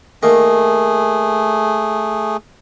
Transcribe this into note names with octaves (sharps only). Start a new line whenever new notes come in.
D#3 A3 A#3 G#4